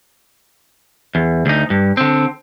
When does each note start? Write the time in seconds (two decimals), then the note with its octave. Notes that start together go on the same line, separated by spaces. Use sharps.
1.15 E2
1.46 D2 D#4
1.70 G2
1.97 D3 C4